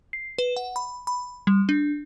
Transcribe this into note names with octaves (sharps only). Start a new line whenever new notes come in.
C7
B4
F#5
B5
B5
G3
D4